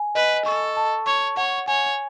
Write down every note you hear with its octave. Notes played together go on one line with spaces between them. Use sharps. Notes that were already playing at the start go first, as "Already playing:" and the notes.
Already playing: G#5
B4 D#5
A4 C#6
A5
C#5 C#6
C#5 F#5
C#5 G#5